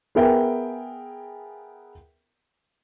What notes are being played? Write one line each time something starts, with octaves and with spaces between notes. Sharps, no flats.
B3 G#4 A#4 E5 G5